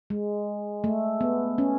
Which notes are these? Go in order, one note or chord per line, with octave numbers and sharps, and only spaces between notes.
G#3
A3
B3
C#4